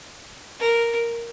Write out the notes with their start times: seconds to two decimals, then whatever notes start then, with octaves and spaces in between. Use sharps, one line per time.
0.59 A#4